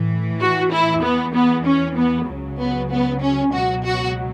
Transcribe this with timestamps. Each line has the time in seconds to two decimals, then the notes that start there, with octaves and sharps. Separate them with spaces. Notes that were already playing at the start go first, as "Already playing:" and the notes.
Already playing: A2 E3
0.40 F#4
0.72 E4
1.03 E2 E3 B3
1.34 B3
1.65 C#4
1.97 B3
2.28 C#2 C#3 F#3
2.59 B3
2.90 B3
3.21 C#4
3.52 C#2 B2 F#3 F#4
3.84 F#4